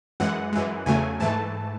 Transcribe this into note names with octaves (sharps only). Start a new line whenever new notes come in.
F#2 E3 G#3 F#5
F#2 E3 G#3
E2 C#3 F#3 A3 G#5
G#2 E3 A3 A5